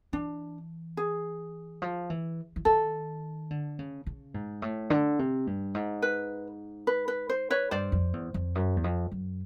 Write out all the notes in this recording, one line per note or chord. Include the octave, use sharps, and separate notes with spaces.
E3 D4
G#4
F3
E3
E3
D#3 A4
D3
C#3
C#3
G#2
A2
D3
C3
G2
G#2
B4
B4
B4
C5
B4 C#5
G2 C5 D5
F2
E2
F2
F#2
E2
F2
F#2